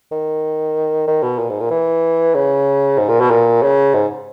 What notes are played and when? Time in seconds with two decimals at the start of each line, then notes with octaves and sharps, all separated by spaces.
0.11 D#3
1.08 D#3
1.23 B2
1.39 A#2
1.49 G#2
1.60 A#2
1.71 E3
2.34 C#3
2.98 G#2
3.09 A#2
3.20 B2
3.31 A#2
3.63 C#3
3.94 G#2